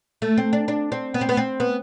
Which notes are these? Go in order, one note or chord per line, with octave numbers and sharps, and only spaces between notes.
A3
C4
D4
D4
C4
B3
C4
B3
C4
B3